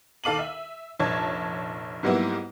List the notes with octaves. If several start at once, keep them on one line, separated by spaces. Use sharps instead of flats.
D#2 A4 F5 D6 D#7 F#7
E5
F1 A#1 C#5 A5 G#6
G#2 F#3 G3 A#3 B3 E4